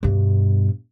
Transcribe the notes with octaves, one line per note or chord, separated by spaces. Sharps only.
G2 B2